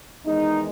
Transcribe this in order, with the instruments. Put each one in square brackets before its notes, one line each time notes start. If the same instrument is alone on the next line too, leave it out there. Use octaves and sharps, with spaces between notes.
[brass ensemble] E2 D#3 G#3 D#4